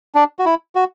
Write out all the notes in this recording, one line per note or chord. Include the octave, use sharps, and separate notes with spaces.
D4
F#4
E4
F#4